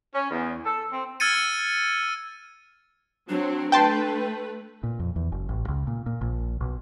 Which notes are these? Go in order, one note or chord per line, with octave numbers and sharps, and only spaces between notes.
C#4
E2
A4
C4
E6 F6 G#6 A6 C#7 D#7
F#3 C4 D4
A3 B4 G5 A5 C6
A#2
F2
E2
F#1
A1
C#2
A#2
A#2
A#1
B1